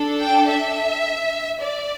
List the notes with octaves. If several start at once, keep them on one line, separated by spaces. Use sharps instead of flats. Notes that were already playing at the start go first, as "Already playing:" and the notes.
Already playing: D4 A4
G5
E5
D5